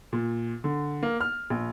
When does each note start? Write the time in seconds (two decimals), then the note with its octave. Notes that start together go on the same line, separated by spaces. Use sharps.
0.13 A#2
0.64 D3
1.03 A#3
1.21 F6
1.50 A#1